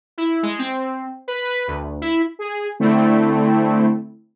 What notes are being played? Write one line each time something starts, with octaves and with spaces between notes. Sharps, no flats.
E4
G#3
C4
B4
D2
E4
G#4
D3 A3 C4 E4